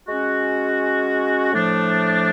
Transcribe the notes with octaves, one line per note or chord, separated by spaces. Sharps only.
G#3 C#4 F#4
A2 F3 A3 D4